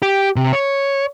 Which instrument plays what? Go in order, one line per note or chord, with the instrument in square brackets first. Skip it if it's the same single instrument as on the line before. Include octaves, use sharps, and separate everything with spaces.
[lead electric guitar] G4
C3
C#5